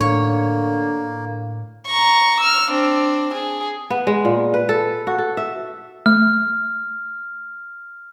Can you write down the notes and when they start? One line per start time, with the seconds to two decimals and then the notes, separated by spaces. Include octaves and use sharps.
0.01 A2 D3 A#3 C#5
1.87 A#5 C#6
2.40 E6 F6
2.70 C4 D4
3.34 G#4
3.90 B3
4.07 G#3
4.25 A#2
4.54 B4
4.69 A4
5.07 F#4
5.18 A4
5.37 E5
6.06 A3 F6